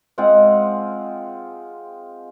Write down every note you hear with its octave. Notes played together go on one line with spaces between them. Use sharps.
G#3 C4 F4 F#5